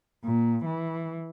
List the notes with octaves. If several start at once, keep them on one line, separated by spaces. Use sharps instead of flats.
A#2
E3